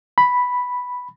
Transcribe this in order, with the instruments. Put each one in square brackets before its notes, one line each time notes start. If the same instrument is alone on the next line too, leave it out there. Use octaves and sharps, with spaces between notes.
[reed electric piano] B5